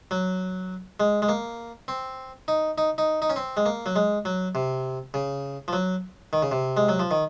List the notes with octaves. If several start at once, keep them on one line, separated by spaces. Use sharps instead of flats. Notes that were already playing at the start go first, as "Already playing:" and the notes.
F#3
G#3
G#3
A#3
C4
D#4
D#4
D#4
D#4
C#4
C4
G#3
A#3
F#3
G#3
F#3
C3
C#3
F3
F#3
D#3
C#3
C3
G#3
F#3
F3
D#3